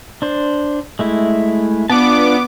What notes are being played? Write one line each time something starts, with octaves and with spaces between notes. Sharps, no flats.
D4 C5
G#3 A3 E4
B3 D4 F4 A5 D6